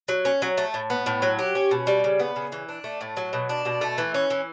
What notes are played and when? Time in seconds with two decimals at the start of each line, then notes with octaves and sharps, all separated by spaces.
0.08 F#3
0.25 C#4
0.42 F#3
0.57 A3
0.74 A2
0.90 B3
1.06 A2
1.22 F#3
1.39 G4
1.55 C#4
1.71 B2
1.87 G3
2.04 C#3
2.19 B3
2.36 C#3
2.52 E3
2.69 D4
2.84 A3
3.01 A2
3.17 F#3
3.33 B2
3.49 D4
3.65 B2
3.81 A3
3.98 E3
4.14 C#4
4.30 E3